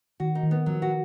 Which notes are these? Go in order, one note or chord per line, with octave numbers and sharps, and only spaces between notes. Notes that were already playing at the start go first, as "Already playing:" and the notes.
D#3 F#4
D#4
D#3
B3
F3 F#3
F#4